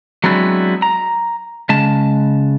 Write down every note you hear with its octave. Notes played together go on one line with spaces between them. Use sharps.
F#3 G#3 B3 C4 D4 E4
A#5
C#3 G#3 A5